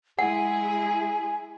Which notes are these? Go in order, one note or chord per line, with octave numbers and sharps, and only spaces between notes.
G#3 E4 G#4 F#5 G#5